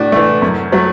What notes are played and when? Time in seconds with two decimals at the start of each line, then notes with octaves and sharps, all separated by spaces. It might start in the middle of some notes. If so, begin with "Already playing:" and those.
Already playing: A2 A3 D4 F#4
0.12 E3 A3
0.42 F#2
0.72 F#3 A3